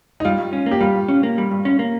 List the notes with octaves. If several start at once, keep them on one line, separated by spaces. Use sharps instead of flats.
D#4
G3 F4
G2
C#4
A#3
G4
G3 F4
G2
C#4
A#3
G3
G2
C#4
A#3